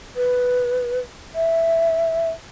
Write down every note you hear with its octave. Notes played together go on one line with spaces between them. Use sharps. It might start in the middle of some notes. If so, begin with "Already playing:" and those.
B4
E5